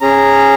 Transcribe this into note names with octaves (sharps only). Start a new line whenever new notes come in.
C#4 G#4 A#5